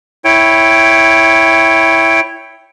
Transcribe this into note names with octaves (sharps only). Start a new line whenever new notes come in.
E4 C#5 G5